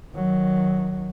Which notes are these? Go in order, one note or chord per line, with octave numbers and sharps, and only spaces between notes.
D#3 F#3